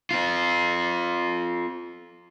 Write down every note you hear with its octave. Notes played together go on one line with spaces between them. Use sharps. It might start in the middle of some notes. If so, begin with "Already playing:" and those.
C4 F4